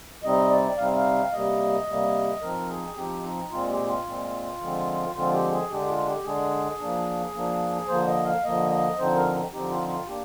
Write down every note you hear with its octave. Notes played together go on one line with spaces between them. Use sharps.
C3 G3 C4 D#4 D#5
D5
C3 G3 C4 D#4 F5
F5
C3 G3 A#3 D#5
C3 G3 A#3
F3 C4 D#4 A#4
G#4
F3 C4 D#4 G4
D#4
A#2 G#3 C4 F4
G4
F4
A#2 G#3 C4
D3 F3 G#3 C4
D3 F3 G#3 C4 F4
G4
G#4
D3 G#3 D4 G4
F4
G4
D3 G#3 D4 G#4
F3 A#3 D4
F3 A#3 D4
D3 F3 A#3 C5
D#5
F5
D3 F3 A#3 D#5
D#5
D3 F3 C4 D#4 C5
A#4
D3 F3 C4 D#4 G4
F4
F4
A#3 D4 G4